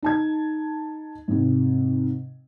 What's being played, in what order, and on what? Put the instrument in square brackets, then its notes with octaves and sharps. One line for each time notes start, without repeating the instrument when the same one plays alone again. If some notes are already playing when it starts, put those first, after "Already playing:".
[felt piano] D#4 A5 G#6
G#2 C3